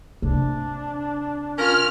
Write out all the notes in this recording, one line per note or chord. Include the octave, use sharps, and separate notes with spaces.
C3 D4
C#4 F4 A#4 F6